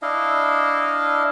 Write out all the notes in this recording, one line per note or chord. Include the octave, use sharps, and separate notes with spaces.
D4 E4 D#5 F5